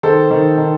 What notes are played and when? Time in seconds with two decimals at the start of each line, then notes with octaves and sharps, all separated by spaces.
0.03 D#3 A4 C5
0.31 D#3
0.58 D#3